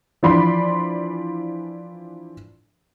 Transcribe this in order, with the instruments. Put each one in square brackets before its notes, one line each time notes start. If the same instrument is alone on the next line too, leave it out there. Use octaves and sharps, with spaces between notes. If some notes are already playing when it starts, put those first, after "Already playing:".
[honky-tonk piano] E3 F3 D4 D5 B5 C6